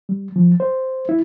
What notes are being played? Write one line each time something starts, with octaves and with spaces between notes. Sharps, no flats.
G3
F3
C5
E4